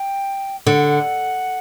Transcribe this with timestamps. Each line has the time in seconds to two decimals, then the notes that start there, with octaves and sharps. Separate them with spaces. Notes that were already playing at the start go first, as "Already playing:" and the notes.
Already playing: G5
0.66 D3 F#5